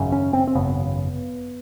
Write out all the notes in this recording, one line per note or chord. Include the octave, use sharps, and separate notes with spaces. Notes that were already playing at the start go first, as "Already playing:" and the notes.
Already playing: G#1 F#2 C#3
C#4
C4
C4
G#1 F#2 C#3 B3